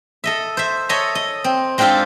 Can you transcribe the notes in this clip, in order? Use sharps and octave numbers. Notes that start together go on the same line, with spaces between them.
A4 D#5 E5
C5 E5
A4 C#5 D#5 E5 G#5 A#5
D#5
C4
G#3 C4 D4 F4 G4 A4